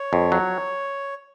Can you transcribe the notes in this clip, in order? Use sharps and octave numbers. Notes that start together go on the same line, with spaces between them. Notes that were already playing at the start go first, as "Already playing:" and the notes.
Already playing: C#5
F2
F#3